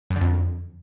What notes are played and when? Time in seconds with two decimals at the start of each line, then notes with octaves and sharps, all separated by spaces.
0.10 F#2
0.16 D3
0.21 F2